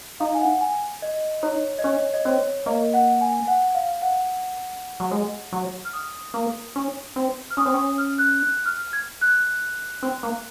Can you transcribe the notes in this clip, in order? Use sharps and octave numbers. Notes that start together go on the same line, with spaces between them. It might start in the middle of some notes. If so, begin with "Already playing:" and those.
D#4 F5
G#5
F#5
G#5
D#5
D#4 C#5
D#5
C#4 C#5
D#5
C4 C#5
A#3 D#5
F#5
G#5
F#5
F5
F#5
F#3
G#3
F#3
F6
D#6
A#3
C#4
C4
F6
C#4 D#6
C4
C#4 D#6
F6
F#6
F#6
F6
G#6
F#6
C4
A#3